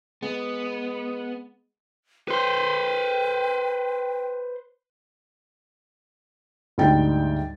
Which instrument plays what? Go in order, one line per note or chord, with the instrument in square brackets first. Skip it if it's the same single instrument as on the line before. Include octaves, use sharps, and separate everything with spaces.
[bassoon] G#3 [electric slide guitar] B3
[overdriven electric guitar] B4 C5 [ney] G5
[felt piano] D2 G#2 G3 G5 A6